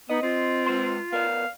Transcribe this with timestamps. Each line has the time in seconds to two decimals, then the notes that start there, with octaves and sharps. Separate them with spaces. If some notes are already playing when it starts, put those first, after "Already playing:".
0.10 B3 D#4 D#5
0.23 C4 F4
0.67 G#3 B4 C6
1.12 B3 A#4 D5 F5